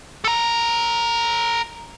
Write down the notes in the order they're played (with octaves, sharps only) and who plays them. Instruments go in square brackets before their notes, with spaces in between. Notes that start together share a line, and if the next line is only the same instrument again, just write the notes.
[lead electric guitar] A4 A#5